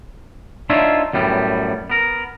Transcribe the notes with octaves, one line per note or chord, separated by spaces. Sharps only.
D4 D#4 F4 C#5 E5
F#2 A2 G3 B3
B3 A#4